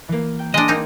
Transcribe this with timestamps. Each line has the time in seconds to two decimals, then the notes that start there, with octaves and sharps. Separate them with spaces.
0.09 E3 A#3
0.39 G5
0.54 E3 G#3 D4 D#5
0.68 A#3 C4 D#4